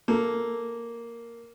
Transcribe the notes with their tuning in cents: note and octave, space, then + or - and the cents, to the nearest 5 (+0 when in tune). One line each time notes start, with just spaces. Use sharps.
A#3 +0 A4 -5